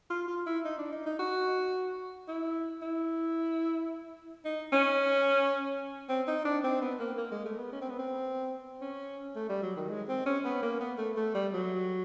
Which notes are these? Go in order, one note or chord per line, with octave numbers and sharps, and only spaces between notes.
F4
F4
E4
D#4
D4
D#4
D#4
F#4
E4
E4
D#4
C#4
C4
D#4
D4
C4
B3
A#3
A#3
G#3
A3
B3
C#4
C4
B3
C4
C#4
A3
G3
F#3
D#3
G#3
C4
C#4
B3
A#3
B3
A3
A3
G3
F#3